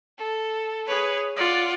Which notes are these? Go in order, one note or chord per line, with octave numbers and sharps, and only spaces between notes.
A4
G#4 B4 C#5
F4 D5 F#5